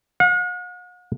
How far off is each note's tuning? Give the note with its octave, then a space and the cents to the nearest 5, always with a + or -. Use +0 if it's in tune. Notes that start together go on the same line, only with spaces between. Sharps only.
F#5 -45